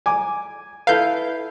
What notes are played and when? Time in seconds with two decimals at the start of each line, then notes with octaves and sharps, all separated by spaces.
0.06 G#5 D6
0.87 E4 A4 B4 F5 G6